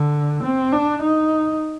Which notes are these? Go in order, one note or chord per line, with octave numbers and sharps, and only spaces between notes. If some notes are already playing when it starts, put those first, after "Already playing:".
Already playing: D3
C4
D4
D#4